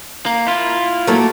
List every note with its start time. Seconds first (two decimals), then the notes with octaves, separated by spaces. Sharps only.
0.26 A#3
0.47 E4 F4
1.07 F#3 A3 A#3